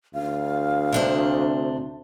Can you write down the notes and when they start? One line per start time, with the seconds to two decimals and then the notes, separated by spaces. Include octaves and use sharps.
0.14 D2 F5
0.93 C3 D4 C5